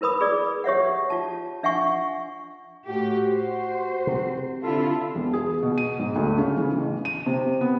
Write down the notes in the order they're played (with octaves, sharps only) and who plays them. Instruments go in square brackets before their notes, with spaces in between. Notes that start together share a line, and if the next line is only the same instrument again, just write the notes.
[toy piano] E4 A#4 B4 B5 D#6
G#4 D5
G4 C#5 E5 F#5
F4 A5
D4 E5 F#5 G#5 C#6
[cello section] A2 G4 [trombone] F#4
[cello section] C5
[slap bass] C3
[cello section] D3 E4 F4 [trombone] A4
[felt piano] E1
G#4
B2
D#7
G#2
D2
C#3
E3
A1
D#7
C3
B3